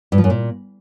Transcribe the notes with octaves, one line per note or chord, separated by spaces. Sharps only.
G2
F3
F#2
A#2